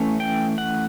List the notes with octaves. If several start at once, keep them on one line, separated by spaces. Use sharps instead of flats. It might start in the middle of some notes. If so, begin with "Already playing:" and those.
Already playing: E3 A3 C#4
G5
F#5